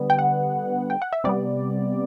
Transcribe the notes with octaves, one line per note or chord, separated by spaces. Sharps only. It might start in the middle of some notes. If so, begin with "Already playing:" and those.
Already playing: D3 G3 B3
G5
F#5
G5
F#5
E5
C3 G3 B3 D5